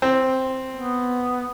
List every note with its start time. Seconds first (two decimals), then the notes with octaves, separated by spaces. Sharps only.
0.02 C4
0.76 B3